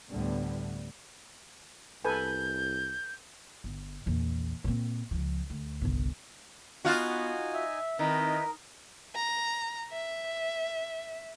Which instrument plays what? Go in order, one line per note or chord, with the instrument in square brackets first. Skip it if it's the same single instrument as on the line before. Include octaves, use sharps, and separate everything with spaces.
[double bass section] D2 A2 D3 G3 B3
[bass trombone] C2 [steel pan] A4 B4 G#5 [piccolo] G6
[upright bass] G1
A#1 E2
A#2 C4
C#2 F3
D2
G1 C2
[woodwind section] B3 [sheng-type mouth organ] D#4 G#5 [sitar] F4 F#4
[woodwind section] E5
[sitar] D#3 [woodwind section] C4 D#5 [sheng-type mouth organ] D#4 E4 B4 [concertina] A#4
[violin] A#5
E5